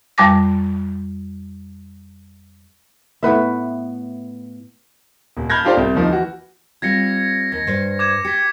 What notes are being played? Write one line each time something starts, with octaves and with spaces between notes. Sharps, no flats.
F2 G3 A5 D6 A#6
A2 B3 B4 E5
D#1
A5 B5 F6 G6 G#6 A#6
D4 F4 G4 A4 C5 D5
C2
D#2 F3 D#4
E3 F#4
G3 C4 F4 G#6 A#6 C#7
D#2 A#6
G2 C5
D6 G#6 E7
G4 B6 C#7